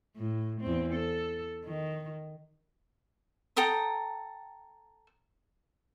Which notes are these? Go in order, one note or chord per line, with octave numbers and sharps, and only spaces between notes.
A2
E2 C4
A4
D#3
A4 G5 A#5 D#6